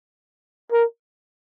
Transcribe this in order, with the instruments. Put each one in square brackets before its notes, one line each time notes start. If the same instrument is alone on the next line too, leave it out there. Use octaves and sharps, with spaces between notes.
[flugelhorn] A#4